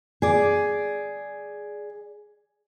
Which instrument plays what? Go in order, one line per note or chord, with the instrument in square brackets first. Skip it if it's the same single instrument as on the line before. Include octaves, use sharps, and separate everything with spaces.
[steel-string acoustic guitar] G#4 D5